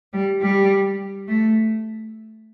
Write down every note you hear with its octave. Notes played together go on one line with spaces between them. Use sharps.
G3
G3
A3